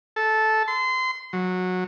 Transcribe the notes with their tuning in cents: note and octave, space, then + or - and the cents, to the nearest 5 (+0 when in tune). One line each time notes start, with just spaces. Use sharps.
A4 -10
C6 -25
F#3 -15